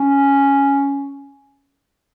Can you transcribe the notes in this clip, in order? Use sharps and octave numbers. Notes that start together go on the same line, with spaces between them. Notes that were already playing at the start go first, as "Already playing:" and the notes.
Already playing: C#4